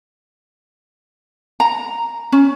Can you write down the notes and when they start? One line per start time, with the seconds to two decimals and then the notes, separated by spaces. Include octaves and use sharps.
1.60 A#5
2.32 C#4